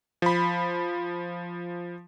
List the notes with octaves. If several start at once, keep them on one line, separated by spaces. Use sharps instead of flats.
F3 B5